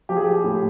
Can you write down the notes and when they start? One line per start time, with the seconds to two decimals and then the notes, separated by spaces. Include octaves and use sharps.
0.09 F3 G4
0.17 G#4
0.24 G4
0.44 A2